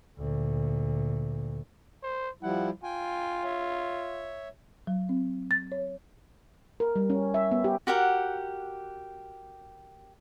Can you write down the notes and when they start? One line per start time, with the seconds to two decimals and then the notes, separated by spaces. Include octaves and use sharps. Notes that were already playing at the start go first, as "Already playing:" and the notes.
0.18 D2 A#2
2.03 C5
2.43 F3 G3 E4 F#5
2.83 F4 G5 G#5
3.44 C#5 E5
4.87 F#3
5.09 C4
5.51 A6
5.72 C#5
6.80 A#4
6.96 G3
7.10 C#4
7.34 E5
7.51 B3
7.64 G4
7.87 F#4 G4 A#4 F#5